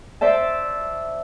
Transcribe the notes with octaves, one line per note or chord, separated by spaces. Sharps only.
C5 D5 E5 A5